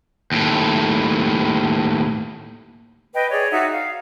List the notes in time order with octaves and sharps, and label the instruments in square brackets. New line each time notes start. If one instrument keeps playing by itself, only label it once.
[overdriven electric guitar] D#2 A2
[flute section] B4 D#5 G5
G#4 C#5 D5
D#4 F#4 E5 F#5
F5